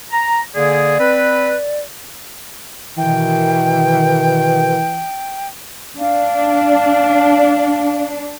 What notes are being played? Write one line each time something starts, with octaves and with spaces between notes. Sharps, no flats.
A#5
D3 A#3 G#4 D5
C4 B4
B2 D#3 E3 G5
D4 F5